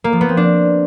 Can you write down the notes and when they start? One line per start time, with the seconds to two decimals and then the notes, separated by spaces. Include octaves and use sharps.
0.04 A#3
0.13 F3
0.21 B3
0.29 C4
0.37 D4